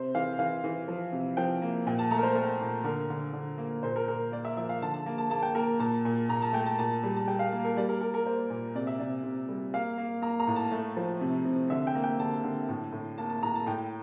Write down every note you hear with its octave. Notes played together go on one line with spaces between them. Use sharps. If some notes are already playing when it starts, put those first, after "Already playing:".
Already playing: C3 C5
E3 F5
E3 F5
E3
F3
C3
F3 G5
A#3
A#2 G5
A5
A3 A#5
A#4
C5
A3 A#4
A#2
D3 A#4
D3
D3
A#3
A#2 C5
A#4
A#2 A#4
A#3 D5
E5
F3 E5
F5
D3 A5
A5
A#3
A5
A#3 A5
G5
A#3 A#4
A#2 A5
A#2
A#2 A#5
A5
A3 G5
A5
A#2 A5
G3
A5
G3 G5
F5
A#3
A#4
G3 D5
A#4
G3 A#4
A#4
A#3 C5
A#2
C3 D5
E5
C3 D5
C3
G3
A#3 F5
A#3
A#3 A#5
A#5
A2
A5
A3
F3
C3
C3
D3 E5
G5
A#3
G5
D3 A5
D3
A2
A2
A#3 A5
A5
A2 A#5
A5
A2 G5